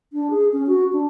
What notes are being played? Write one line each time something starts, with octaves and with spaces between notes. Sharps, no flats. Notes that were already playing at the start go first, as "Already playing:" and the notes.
D4
G#4
C#4
F#4
D4